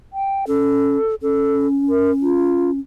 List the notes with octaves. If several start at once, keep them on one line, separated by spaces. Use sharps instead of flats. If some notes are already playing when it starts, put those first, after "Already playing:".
G5
C#4 A4
C#4 A4
A#4
F4